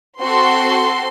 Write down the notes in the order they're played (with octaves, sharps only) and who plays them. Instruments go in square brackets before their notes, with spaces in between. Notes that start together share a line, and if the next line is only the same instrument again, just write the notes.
[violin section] C4 F#4 A4 C6